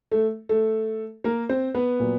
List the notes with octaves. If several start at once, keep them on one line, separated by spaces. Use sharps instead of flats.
A3 A4
A3 A4
A#3 A#4
C4 C5
B3 B4
A#2 F#3 A#3